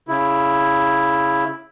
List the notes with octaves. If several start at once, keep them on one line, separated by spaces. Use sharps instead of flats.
C#3 E4